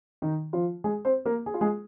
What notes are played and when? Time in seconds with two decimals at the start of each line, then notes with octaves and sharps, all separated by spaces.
0.22 D#3 D#4
0.53 F3 F4
0.84 G#3 G#4
1.05 C4 C5
1.26 A#3 A#4
1.46 G#4
1.54 F4
1.61 G#3 G#4